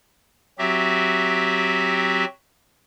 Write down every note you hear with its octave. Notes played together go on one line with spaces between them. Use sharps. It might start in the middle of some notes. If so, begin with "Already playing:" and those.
F#3 C4 F#4 G4 E5